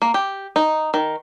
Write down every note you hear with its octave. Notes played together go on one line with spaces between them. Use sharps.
A#3
G4
D#4
D#3